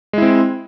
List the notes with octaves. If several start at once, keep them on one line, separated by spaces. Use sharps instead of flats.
G#3 C4 E4